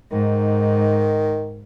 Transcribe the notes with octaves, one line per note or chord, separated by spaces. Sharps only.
G#2 D#3